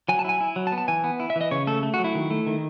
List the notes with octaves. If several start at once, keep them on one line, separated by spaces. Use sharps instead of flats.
F#3 G#5
A5
E4 G#5
E4
F#3
A5
B3
A5
E3 G#5
B3
E4
E5
E3
D#5
C#3 C#5
A3 A4
A3
F#4
F#3
E4
D#3
A3
D#3